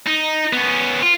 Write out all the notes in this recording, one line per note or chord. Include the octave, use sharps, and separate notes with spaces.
D#4
B3 C#4
F4